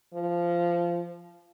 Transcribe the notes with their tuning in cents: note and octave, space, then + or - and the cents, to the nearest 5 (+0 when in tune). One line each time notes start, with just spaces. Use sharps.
F3 -15